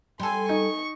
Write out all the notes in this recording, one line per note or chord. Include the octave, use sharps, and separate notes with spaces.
G3 A4 G#5 C6
D#4 C#6